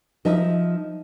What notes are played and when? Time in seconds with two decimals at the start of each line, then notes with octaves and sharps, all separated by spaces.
0.25 F3 D#4 E5